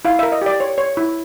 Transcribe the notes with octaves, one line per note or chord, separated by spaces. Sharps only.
E4 F5
A#4 E5
D#5
G4 D5
C#5
C#5
E4